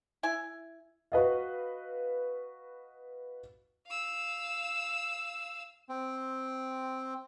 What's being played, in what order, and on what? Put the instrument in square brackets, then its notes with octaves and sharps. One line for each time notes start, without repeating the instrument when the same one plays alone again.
[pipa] E4 E5 G#5
[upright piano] F#4 B4 D#5 F5
[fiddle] F5 E6
[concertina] C4